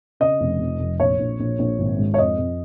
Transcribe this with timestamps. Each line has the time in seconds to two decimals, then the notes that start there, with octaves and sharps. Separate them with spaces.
0.20 C#3 D#5
0.40 F1
0.60 F2
0.79 F1
0.99 A#1 C#5
1.20 A#1
1.40 A#1
1.59 A#1
1.79 G#1
1.99 G#2
2.14 C#5
2.18 F2 D#5
2.38 F2